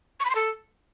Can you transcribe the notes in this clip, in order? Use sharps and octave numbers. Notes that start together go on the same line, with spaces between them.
C#6
B5
C6
A4